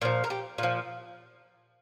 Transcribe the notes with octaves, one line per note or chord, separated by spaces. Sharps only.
A#2 F3 A#4
A#4
G4
A#2 F3 F4